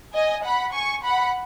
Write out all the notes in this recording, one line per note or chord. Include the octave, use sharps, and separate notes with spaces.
D#5 G#5
F#5 B5
G#5 C#6
F#5 B5